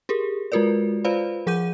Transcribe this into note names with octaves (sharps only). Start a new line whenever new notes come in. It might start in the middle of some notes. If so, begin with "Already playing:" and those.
G4 G#4 A#4
G#3 F4 F#4 A#4 B4 D5
F4 B4 C5 D5 F5 B5
F3 G#4 F#5 D6 G6 D#7